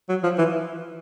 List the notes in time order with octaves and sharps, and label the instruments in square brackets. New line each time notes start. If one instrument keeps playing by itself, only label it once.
[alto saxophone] F#3
F3
E3